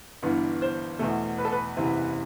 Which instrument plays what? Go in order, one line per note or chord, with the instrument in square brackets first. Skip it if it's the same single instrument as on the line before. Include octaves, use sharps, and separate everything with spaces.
[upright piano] G1 G2 E3 B3
C5
E2 B2 A3
B4
A4
B4
F#1 E2 C3 E3